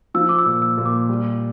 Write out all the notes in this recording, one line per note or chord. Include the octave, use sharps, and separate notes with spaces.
F3 E6
D6
E6
A#2
E6
A#2
D6
G3